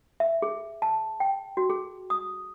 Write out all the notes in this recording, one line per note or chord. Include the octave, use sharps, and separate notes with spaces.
E5
G#4
A5
G5
F#4
G#4
D#6